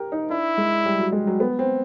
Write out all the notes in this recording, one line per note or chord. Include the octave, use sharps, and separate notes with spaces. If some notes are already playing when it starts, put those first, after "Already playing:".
Already playing: G4 A#4
D#4
D4 E4
G#3
G3
F#3
G#3
F#3
B3
C4